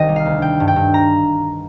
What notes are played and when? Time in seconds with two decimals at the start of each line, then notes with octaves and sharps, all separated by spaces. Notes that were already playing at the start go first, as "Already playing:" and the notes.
Already playing: C2 D#3 D#5 G5
0.09 G3
0.16 F5
0.25 D2
0.42 G3 G5
0.60 G2
0.68 G5
0.76 G2
0.94 A#5